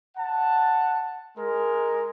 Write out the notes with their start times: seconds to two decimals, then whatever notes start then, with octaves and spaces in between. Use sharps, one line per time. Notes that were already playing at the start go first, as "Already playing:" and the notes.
0.17 F#5 A5
1.37 G#3 A#4